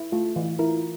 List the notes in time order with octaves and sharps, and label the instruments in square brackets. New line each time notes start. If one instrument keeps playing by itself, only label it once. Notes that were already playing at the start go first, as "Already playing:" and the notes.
Already playing: [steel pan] E4
[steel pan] A3 [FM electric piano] F4
[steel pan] E3
[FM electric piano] E4 [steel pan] A#4